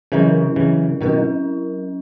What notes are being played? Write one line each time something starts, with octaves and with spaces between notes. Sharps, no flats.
C#3 E3 F#3 C#4 E4 A#4
C#3 E3
B2 D#3 F#3 C#4 E4 A#4